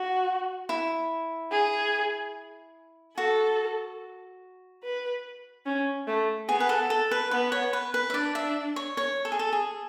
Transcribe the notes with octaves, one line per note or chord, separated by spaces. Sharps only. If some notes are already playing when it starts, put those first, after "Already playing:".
Already playing: F#4
E4
G#4
F#4 A4
B4
C#4
A3
B3 G#4
B4
A4
A4
B4
B3 B4
C#5
B4
B4
E5
D4 D5
E5
C#5
C#5
A4
G#4
A4
G#4